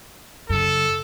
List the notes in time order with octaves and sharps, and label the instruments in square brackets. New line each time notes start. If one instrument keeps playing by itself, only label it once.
[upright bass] F#2 C#3 [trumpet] A4